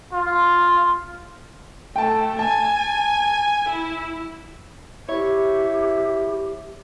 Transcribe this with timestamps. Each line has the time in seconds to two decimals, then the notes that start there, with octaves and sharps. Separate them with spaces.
0.13 F4
1.96 A3 G5 A5
2.39 G#5 A5
3.69 E4
5.09 E4 G4 C#5